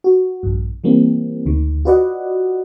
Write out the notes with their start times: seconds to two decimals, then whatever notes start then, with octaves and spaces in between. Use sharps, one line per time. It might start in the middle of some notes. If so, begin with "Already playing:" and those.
0.04 F#4
0.43 A#1 G2
0.84 E3 G3 A#3 C4
1.46 D2 D#3
1.85 F4 F#4 B4 D5 D#5 F#5